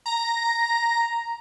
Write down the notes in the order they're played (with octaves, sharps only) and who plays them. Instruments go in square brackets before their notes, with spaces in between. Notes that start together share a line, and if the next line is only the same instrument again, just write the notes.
[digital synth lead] A#5